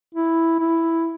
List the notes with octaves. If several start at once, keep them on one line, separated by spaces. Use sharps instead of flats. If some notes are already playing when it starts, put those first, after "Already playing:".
E4
E4